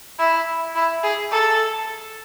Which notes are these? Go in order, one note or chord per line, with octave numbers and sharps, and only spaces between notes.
E4
E4
G#4
A4